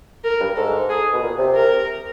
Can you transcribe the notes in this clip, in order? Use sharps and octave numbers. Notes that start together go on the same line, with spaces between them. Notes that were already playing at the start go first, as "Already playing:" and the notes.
A#4
G2
G#2 A4
G#4
B2
A#2
C3
A#4